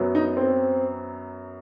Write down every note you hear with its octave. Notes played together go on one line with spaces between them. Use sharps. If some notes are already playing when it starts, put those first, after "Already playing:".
Already playing: F#2 F#3 B3
D#4
C4